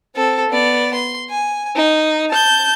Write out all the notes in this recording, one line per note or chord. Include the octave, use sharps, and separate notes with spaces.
C4 A4
B3 D5
C6
G#5
D#4
A5 G6